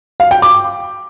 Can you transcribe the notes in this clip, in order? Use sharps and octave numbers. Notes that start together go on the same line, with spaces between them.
F5
G5
D6